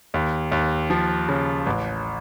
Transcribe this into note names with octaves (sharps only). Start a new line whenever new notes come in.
D#2
D#2
F3
C#3
A1